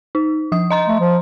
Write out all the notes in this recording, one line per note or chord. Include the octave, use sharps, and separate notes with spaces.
D#4
F3 D#6
D#5 A#5 C6
A3
F3